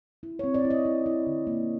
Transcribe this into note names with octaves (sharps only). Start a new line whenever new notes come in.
E4
C4 C#5
D5
E4
D#5
E4
E4
D3
A#3